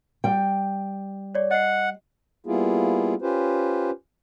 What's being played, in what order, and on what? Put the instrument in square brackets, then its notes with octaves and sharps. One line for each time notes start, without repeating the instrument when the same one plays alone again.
[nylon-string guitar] G3 G5
[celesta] C#5 D5
[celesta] D#5 C7 [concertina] F#5
[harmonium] G3 A#3 B3 E4 F4 G#4
C#4 F4 G4 B4 C5